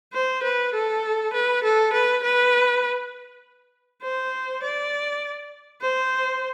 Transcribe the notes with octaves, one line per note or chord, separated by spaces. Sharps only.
C5
B4
A4
B4
A4
B4
B4
C5
D5
C5